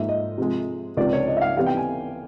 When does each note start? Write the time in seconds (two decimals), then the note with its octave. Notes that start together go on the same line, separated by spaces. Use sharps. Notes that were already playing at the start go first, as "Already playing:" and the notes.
Already playing: G#2 F3 A#3 D#4 E5
0.09 D#5
0.38 C3 F3 G#3
0.97 C#2 C3 F3 D5
1.13 C#5
1.28 D#5
1.37 E5
1.41 F5
1.57 C3 E3 G3 B3 F5
1.66 G5
1.77 G#5